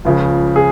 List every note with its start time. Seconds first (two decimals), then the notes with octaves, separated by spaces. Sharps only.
0.05 C#2 C#3 F3
0.56 G#4